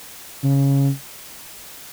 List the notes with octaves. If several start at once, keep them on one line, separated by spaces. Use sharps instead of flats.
C#3